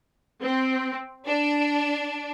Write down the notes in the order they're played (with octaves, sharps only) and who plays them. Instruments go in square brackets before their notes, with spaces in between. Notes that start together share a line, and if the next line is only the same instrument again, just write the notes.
[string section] C4
D4